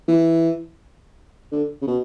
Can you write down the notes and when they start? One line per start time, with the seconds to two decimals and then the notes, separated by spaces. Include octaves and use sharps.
0.08 E3
1.52 D3
1.82 C#3
1.88 B2